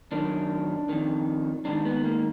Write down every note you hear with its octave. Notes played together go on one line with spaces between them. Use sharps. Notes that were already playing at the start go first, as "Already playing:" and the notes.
F#2 D#3 D4
F2 D#3
G#2 D#3 D4
B3
A#3